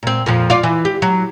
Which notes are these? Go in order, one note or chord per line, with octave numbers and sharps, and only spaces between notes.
A#2 C4
F2 A#2 F3
F4 D5
E3
G4
F#3